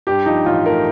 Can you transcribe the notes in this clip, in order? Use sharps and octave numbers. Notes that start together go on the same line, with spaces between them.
G2 G4
F3 D#4
A1 F4
A3 A#4